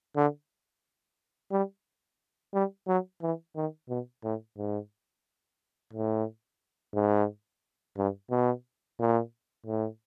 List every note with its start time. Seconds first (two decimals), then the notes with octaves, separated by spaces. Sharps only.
0.16 D3
1.52 G3
2.54 G3
2.87 F#3
3.22 E3
3.56 D#3
3.89 B2
4.24 A2
4.58 G#2
5.93 A2
6.94 G#2
7.97 G2
8.30 B2
8.99 A#2
9.66 A2